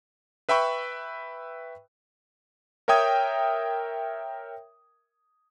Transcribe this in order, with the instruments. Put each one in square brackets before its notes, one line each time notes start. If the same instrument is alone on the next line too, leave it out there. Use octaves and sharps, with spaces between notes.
[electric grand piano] B4 E5 G5 B5 C#6
A#4 C#5 E5 G5 D#6 G#6